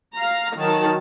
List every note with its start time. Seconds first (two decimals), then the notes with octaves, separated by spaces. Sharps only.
0.14 F5 A#5
0.55 D#3 F#3 A5